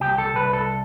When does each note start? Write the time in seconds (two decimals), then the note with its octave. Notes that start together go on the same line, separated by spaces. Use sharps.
0.01 C2 G4
0.18 A4
0.35 C2 B4
0.53 A4